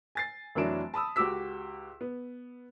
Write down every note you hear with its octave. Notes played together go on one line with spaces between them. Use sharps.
G#5 A6 C7
F1 E3 F#3 D4 D7 E7
A5 B5 D#6 E6
C#2 F#4 G4 D6 E6 B6
B3